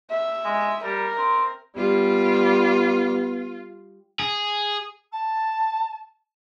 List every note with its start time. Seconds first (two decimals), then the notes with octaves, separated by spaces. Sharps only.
0.10 E5
0.45 G#3
0.84 G3 A#4
1.18 C4
1.77 G3 B3 F4
4.20 G#4
5.12 A5